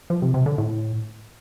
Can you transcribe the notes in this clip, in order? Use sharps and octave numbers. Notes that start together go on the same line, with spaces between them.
F3
C3
C3
D3
A2